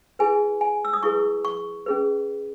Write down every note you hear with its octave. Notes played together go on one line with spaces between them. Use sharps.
E4 G#4 B4 G#5
G#5
E6
D#6
E4 G#4 B4 C#6
C#6
C#4 G#4 B4